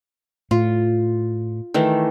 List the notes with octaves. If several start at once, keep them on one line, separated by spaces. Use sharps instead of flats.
A2 F4
D#3 E3 A3